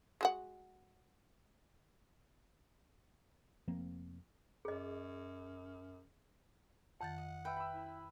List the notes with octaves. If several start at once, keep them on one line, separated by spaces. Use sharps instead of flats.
G#3 F#4 F#5
F1 F3 A#3 C4
F#2 G#4 D#5
F2 D#3 F#5 A6
D#5
B4 E5 G5
B5 E6
E4